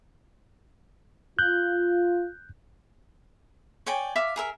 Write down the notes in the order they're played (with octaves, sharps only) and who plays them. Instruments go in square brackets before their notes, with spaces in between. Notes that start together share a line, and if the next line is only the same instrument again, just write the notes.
[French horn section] F4 [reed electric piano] F#6 G6
[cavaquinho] C#5 D5 G5 G#5
E5 F5 D6
G#4 A#4 E5